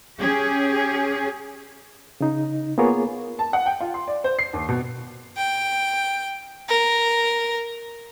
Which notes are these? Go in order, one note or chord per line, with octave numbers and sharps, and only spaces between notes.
C#4 G4 G#4
C#3 D#4
A#3 B3 F4 G#4 A#4 C#5
A5
F#5
G5
F4
C6
D5
C5
C7
D#2
B2
G5
A#4